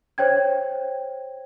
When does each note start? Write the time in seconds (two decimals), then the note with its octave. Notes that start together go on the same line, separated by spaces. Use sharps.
0.18 C5 C#5 G5 G#6